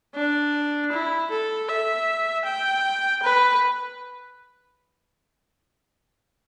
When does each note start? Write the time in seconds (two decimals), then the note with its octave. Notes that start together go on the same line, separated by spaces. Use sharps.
0.15 D4
0.92 E4
1.31 A4
1.69 E5
2.46 G5
3.23 B4